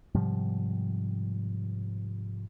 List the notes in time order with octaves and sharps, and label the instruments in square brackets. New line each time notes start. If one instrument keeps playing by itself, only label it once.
[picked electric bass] G#2 C3 F3 G3